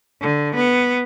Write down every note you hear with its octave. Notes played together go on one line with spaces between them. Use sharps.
D3
B3